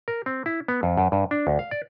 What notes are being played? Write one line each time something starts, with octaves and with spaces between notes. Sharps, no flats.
A#4
C4
E4
B3
F2
F#2
G2
D4
D2
F5
D5